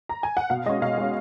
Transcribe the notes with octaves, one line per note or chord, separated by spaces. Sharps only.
A#5
G#5
F#5
B2 F5
G#3 C#4 D#5
B2 F5
G#3 C#4